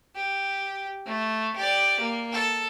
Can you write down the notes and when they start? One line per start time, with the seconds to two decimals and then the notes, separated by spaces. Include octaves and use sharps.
0.16 G4
1.06 A3
1.56 G4 D5
2.00 A#3
2.32 A4